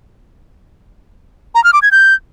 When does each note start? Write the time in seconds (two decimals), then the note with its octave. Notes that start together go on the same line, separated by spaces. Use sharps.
1.55 A#5
1.64 F6
1.73 D6
1.82 G#6
1.91 G6